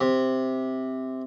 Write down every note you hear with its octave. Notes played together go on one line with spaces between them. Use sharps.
C3